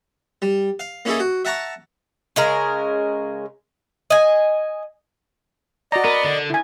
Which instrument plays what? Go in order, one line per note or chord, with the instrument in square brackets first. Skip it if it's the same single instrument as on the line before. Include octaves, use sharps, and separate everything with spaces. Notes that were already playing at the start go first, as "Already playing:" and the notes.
[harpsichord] G3
F5
A#3 C#4 D#4 E4 G#4 A4
F#4
E5 F#5 A5 A#5 C#6
[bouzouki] C#3 G#3 A#4
D#5 G#5
[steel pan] F#4 A#5 [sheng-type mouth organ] D5 D#5
[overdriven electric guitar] B3 [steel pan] A#4
[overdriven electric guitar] D3
[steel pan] E4 G#5